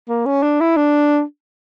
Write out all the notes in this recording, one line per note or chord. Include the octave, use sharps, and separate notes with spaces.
A#3
C#4
D4
E4
D4